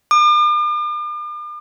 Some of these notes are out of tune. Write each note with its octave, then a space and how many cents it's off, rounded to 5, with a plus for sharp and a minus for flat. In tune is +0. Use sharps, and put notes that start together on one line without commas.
D6 +45